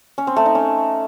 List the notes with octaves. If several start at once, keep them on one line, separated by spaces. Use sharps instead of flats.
C#4
C4
A3
D#4
C#4